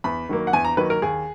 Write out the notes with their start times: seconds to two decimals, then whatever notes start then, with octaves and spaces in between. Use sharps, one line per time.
0.04 E2 B5
0.29 D#3 F#3 A#3
0.47 F#5
0.53 E2 G#5
0.65 A#5
0.77 D#3 F#3 A#3 B4
0.90 A#4
1.02 D#2 G#4